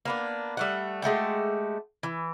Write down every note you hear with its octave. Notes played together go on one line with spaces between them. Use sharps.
A#3 B3 D4
G3 A3 F#5
G#3 A3 F#4 G4
E3